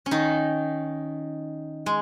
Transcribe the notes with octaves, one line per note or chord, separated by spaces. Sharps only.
C#4
D#3 D#4
G#3